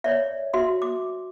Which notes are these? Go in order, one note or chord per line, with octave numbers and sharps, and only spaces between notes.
C#5 D5 E5
F#4 E5 C6
D6